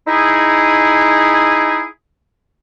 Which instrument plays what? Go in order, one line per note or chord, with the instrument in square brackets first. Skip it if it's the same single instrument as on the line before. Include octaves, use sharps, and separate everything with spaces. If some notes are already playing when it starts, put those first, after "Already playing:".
[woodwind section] D#4 E4 G#4